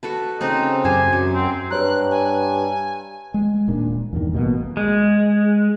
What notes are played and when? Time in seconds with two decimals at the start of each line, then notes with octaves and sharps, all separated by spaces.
0.03 F#4 A4 B4
0.41 C#3 C4 D#4
0.84 F#2 G4 C5 G#5
1.13 F#2 F#3
1.35 C4
1.71 G2 B4 C#5 A#5 F#6
2.11 G#5
3.34 G#3
3.68 D#1 A#2 D4
4.13 E2 G2 D#3
4.33 A1 B2 D#3 A#3
4.77 G#3